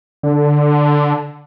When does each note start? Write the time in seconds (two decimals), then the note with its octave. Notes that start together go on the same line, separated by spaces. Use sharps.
0.23 D3